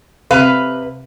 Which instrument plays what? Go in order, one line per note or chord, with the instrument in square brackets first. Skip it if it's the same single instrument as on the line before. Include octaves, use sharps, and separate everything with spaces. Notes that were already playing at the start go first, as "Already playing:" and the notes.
[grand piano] C3 [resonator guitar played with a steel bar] B4 F5